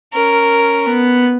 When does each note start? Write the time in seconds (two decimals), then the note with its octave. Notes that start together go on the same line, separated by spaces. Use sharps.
0.13 C#4 A#4
0.86 B3